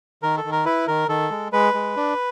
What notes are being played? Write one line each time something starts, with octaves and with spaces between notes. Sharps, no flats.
D#3 A#4
A4
D#3
A#4
E4 B4
D#3 A#4
D#3 A4
G#3
G#3 B4
G#3
D4